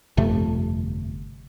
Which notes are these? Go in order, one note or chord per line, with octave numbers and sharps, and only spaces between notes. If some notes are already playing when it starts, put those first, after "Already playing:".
G1 F2 C3 A3